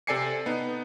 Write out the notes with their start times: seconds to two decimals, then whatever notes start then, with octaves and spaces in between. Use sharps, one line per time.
0.07 C3 A4 D5 G#5 C7 C#7
0.46 B3 D#4